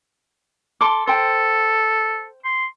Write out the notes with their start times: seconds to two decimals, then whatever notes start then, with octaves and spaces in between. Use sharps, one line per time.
0.81 A4 C6 D6
1.08 A4 C5 G5
2.45 C6